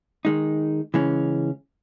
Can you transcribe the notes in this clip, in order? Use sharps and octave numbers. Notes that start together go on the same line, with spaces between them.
D#3 G#3 D#4
C#3 E3 G#3 C#4